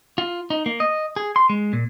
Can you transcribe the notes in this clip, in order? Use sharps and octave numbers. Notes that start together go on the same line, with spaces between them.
F4
D#4
A#3
D#5
G#4
C6
G#3
A#2